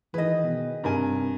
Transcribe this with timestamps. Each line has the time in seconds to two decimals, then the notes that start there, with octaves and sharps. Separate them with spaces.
0.14 D#3 E3 G#4 B4 D#5
0.43 B2
0.84 G2 C3 A#4 G#5